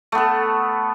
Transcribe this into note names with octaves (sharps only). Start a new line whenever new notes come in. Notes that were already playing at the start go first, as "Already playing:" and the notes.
A3 B3 A4